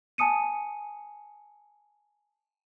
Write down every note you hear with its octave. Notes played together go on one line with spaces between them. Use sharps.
G#5 A5 D#6 C#7 D#7